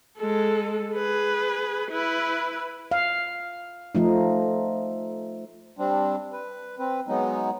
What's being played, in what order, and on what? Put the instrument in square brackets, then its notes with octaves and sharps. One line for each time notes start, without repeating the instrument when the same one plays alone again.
[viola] G#3 A4
G#4 B4
E4 B4
[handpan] F5
F3 A3 D#4
[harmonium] G3 C4 D4
B4
C4 B4
F#3 G#3 B3 D#4